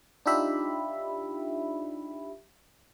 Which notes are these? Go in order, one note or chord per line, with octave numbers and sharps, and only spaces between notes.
D4 D#4 F4 G4 E5 B5